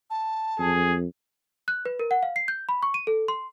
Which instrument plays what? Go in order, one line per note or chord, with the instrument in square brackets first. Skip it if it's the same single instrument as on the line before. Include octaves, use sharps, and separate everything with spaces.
[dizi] A5
[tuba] F2 [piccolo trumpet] G#4
[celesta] F#6
B4
A#4
F#5
F5
C7
G6
B5
C#6
D#7
A4
C6